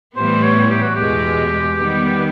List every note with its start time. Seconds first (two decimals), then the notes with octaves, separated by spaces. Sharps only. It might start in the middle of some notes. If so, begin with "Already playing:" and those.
0.16 A2 E3 G3 B3 C5
0.43 C#5
0.70 G4
0.82 F#4
0.95 E2 B2 G#3 G4
1.76 D#3 G3 B3